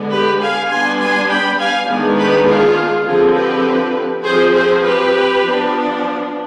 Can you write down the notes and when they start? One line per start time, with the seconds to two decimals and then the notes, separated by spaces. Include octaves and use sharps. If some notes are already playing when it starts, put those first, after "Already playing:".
Already playing: D3 G#3 B3
0.11 G4 B4
0.41 F5 G#5
0.70 G3 B3 D4 G#5 C6
1.00 G#5 C6
1.30 G5 B5
1.59 F5 G#5
1.89 D#3 G#3 B3 D4
2.18 G4 B4
2.47 F4 G#4
3.06 D3 F3 C4 F4 G#4
3.36 G4 B4
4.24 F3 C4 G#4 C5
4.54 G#4 C5
4.83 G4 B4
5.42 F3 B3 D4